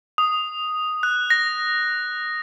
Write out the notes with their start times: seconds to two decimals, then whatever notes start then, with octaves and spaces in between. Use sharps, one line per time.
0.18 D#6
1.03 F#6
1.30 A#6